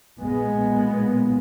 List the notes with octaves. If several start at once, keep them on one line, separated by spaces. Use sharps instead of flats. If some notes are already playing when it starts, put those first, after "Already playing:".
B1 A#2 G#3 B3